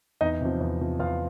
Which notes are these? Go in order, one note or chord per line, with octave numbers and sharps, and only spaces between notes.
E2 D#4 D#5
C3 F3
E2
C3 F3
E2 F4 F5